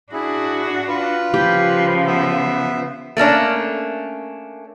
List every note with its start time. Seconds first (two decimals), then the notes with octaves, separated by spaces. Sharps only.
0.12 D4 E4 F#4 G#4
0.88 F4 B4
1.34 C#3 F3 G4
2.07 B3 E5
3.17 A3 A#3 C#4 D4